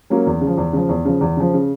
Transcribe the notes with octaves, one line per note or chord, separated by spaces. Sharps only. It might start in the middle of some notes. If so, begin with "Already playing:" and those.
F#3 A#3 C#4
E2
C#3
F3
E2
C#3 F3
E2
C#3 F3
E2
C#3 F3
C#3